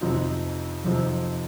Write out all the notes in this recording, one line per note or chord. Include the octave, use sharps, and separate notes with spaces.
F2 C3 F3 C4 D#4
F2 C3 F3 C4 D#4